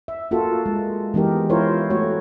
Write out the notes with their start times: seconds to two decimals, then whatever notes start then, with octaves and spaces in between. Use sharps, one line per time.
0.08 E5
0.31 A#3 F4 F#4 A4
0.66 G#3
1.14 E3 G#3 B3 D#4 G4 A#4
1.50 E4 F4 A#4 C5 C#5
1.90 A3 F#4 C#5